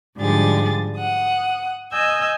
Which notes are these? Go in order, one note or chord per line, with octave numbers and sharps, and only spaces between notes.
G#2 D3 F3 G3 G#4 A6
F#5 D#6
D#5 G#5 E6 G6